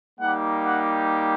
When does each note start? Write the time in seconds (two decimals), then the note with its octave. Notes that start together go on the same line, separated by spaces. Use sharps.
0.20 G3 A#3 D#4 G4 F#5
0.65 F#5